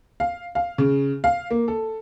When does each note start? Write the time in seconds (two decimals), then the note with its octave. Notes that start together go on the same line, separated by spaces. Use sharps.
0.20 F5
0.55 F5
0.78 C#3
1.24 F5
1.51 A#3
1.68 A4